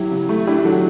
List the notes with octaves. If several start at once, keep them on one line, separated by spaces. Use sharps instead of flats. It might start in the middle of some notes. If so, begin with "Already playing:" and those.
Already playing: F#3 E4 G4
C#3
A3
D4 E4 G4
F#3 F#4 A4